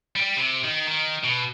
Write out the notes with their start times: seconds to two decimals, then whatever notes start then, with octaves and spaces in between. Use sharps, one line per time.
0.16 G3
0.37 C3
0.64 D#3
0.88 D#3
1.24 B2